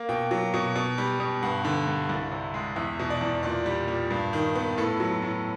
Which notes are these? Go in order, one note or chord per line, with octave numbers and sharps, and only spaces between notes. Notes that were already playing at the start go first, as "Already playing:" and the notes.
Already playing: A#3
B2 G5
F#3
B2
B2
G3
B2
G2 F#5
D3
G2
C2
C3
G#3
E2 E5
B2
D5
E2
A#2 D5
G3
A#2
G2
D#3
B3
A2 A4
F#3
A2